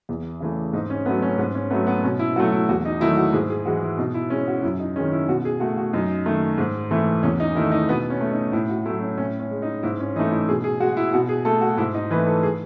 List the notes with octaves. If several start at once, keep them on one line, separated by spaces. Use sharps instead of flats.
E2
C#3 E3 A3
G#2 D#4
C#4
F#3 A3 B3
C#4
G#2 B3
C#4
F#3 A3 B3
B3
B2 C#4
E4
F#3 A3 F#4
E4
E2 F#4
D#4
D#3 F#3 A3 E4
F#4
G#2 G#4
G#4
E3 G#3 F#4
E4
B2 D#4
E4
G#3 C#4
F#4
F#2 E4
D#4
D#3 G#3 C#4
E4
B2 F#4
G#4
A3 F#4
F#4
F#2 D#4
D#3 A3
G#2
E3 A3
E2 C#4
D#4
D#3 A3 E4
D#4
B2 B3
C#4
A3
D#4
A2 E4
F#4
F#3 A3 E4
C#4
A2 C#4
C#4
G#3
D#4
G#2 E4
C#4
E3 A3 D#4
E4
B2 G#4
G#4
G#3 F#4
E4
B2 F#4
G#4
A3 A4
F#4
G#2 E4
D#4
E3 A3 B4
A4
G#4